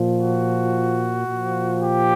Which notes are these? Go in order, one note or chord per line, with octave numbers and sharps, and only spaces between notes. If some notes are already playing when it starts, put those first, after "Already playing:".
Already playing: A#2 F3
F#4
A#2 F3
G4